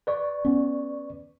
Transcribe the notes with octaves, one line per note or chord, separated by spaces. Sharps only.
B4 D5 C#6
B3 C#4